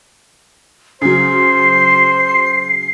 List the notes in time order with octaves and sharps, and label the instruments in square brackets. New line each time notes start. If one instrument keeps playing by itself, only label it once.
[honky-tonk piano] C#3 F#3 [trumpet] C5 [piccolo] C7